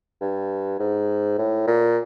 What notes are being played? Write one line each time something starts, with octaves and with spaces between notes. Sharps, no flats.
G2
G#2
A2
A#2